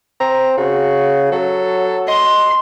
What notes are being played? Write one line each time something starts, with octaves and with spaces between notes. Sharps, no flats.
C4 A#5
C#3 F#4
F#3 A4
D#5 C6